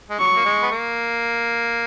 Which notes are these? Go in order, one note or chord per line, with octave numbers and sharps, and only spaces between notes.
G#3
F#3 C#6
A#3
G#3
B3
A#3